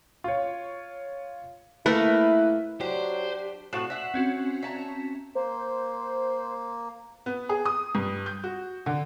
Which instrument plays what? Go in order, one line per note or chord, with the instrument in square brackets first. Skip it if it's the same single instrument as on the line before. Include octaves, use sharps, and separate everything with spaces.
[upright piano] F4 C#5
[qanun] A3 A#4 [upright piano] A#3 B4 [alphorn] E4
[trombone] F#3 [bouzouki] D4 [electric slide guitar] G4 [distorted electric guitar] C5
[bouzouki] A2 C4 F#4 [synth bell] F#6 C7 E7
[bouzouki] E5 F#5
[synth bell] C4 C#4 F#4
[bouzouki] E5 A5 A#5
[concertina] A#3 [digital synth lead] C5
[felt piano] B3
G#4
D#6
G2
G6
F#4
D3